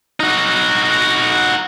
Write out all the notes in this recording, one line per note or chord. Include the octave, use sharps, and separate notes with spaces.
D#4 F#4